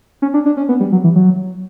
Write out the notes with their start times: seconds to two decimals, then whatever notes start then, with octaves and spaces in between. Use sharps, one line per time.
0.22 C#4
0.34 D4
0.46 D4
0.57 C#4
0.69 B3
0.80 G3
0.92 F#3
1.04 E3
1.16 F#3